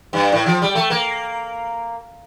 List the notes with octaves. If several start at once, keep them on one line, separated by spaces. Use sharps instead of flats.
G2
A2
F3
G3
A3
A#3